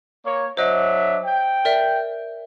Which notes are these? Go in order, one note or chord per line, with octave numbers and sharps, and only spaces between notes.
A#3 C#5
F#3 D4 C5 D#5 E5
G5
A#4 D5 E5